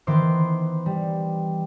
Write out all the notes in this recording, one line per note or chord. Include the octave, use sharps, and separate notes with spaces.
D#3 E3 B3 C5 C6 D6
G3